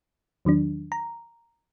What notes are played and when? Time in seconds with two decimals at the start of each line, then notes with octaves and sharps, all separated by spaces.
0.45 E2 D#3 F#3 D4
0.92 A#5